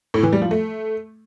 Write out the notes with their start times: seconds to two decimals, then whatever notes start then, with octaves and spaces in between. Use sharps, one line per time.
0.14 A2
0.23 E3
0.33 G3
0.42 F3
0.51 A3